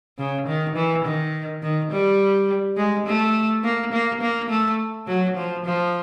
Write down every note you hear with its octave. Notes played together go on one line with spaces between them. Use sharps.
C#3
D#3
E3
D#3
D#3
G3
G#3
A3
A#3
A#3
A#3
A3
F#3
F3
F3